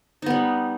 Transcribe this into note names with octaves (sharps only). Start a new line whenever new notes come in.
G3 B3 D#4